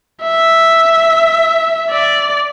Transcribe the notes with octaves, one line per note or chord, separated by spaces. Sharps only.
E5
D5